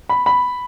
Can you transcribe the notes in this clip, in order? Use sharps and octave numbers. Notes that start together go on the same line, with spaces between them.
B5
B5